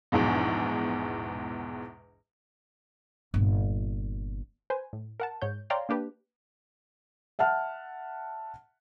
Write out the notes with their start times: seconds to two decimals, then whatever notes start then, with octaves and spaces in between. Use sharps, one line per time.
0.12 A#1 E2 G#2 B2
3.34 G1 A#2
4.70 B4 C5 G#5
4.93 A2
5.20 A#4 F#5 A5
5.42 G#2 C#5 G6
5.70 C#5 D5 F5 G5 A#5 C6
5.89 A#3 D4 G4 B4
7.39 E5 F#5 A5 F6